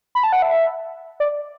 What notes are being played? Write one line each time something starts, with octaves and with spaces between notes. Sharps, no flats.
B5
A5
F#5
E5
D5